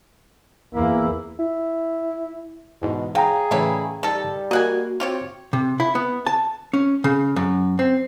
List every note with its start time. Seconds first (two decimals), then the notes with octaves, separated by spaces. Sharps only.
0.74 E2 A#3 E4
1.39 E4
2.82 E2 G#2 B2
3.15 F#3 G#4 F5 G5 A#5
3.51 A2 C#3 E3 G3 A3 E4
4.03 D#3 G3 A4
4.51 A#3 F#4 D#5 F#5 G#5
5.00 C4 F4 G4 C#5
5.53 C3
5.80 E4
5.95 B3
6.27 A5
6.73 C#4
7.04 C#3
7.36 F#2
7.79 C4